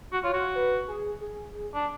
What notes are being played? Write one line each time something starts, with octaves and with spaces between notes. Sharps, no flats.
F#4
F4 C#5
F#4
B4
G#4
G#4
D4